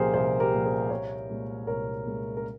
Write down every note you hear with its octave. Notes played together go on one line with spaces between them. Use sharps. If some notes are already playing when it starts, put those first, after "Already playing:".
Already playing: C2 A#2 F3 G4 G#4 A#4 C5
C2 G#4 C5
G4 A#4
A#2 F3
G#4 C5
C2 A#4 C#5
A#2 G#3
C2 A#4 C#5
A#2 G#3
A#4